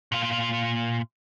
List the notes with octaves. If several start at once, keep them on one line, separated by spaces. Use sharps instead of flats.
A#2 F4